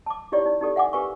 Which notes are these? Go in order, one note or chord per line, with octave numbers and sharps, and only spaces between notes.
A5 D6
D#4 E4 G4 C#5 D5
D#4
D#4 G4 A4 D5
E5 F#5 G#5 D6
G4 A#4 B4 F5 G#5 C#6